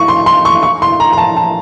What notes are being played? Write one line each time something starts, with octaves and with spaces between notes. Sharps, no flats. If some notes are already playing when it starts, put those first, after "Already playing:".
Already playing: C#6
C6
C6
C#6
C#6
C6
A#5
A#5
A5
A5